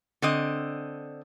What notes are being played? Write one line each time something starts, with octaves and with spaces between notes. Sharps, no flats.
D3 C4 D#5